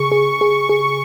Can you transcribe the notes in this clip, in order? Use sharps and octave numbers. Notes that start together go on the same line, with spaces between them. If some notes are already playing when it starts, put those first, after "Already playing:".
Already playing: C#3 G#4 C#6
G#4
G#4
G#4